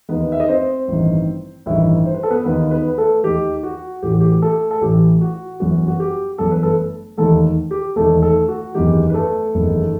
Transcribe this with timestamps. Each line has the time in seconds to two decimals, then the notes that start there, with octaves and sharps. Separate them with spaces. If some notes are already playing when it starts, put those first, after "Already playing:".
0.09 D#2 D#3 B3 B4
0.32 E5
0.40 D#5
0.49 C4 C5
0.88 A1 G2 D#3
1.66 A1 G2 D#3 E4 E5
2.06 C5
2.14 B4
2.23 A4
2.31 B3 B4
2.45 D#2 D#3 B3 B4
2.71 B3 B4
2.88 B4
2.98 A3 A4
3.24 D#2 D#3 G4
3.63 F#4
4.03 A1 A2 E3 G4
4.12 F#4
4.20 G4
4.42 A3 A4
4.71 A4
4.81 A1 A2 E3 G4
5.21 F#4
5.60 G1 F#2 E3 F#4
5.88 F#4
6.00 G4
6.38 G1 F#2 E3 A4
6.51 B4
6.63 A3 A4
7.17 E1 D#2 D#3 A3 A4
7.71 G4
7.96 E1 D#2 D#3 A3 A4
8.22 A3 A4
8.48 F#4
8.75 F#1 E2 D#3 G4
9.10 B4
9.14 A3 A4
9.54 F#1 E2 D#3